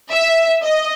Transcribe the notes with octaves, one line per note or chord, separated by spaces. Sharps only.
E5
D#5